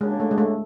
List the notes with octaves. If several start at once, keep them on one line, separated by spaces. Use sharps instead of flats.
D#2 C#3 F#3 G#3 A#3 D4
A3
G#3
A3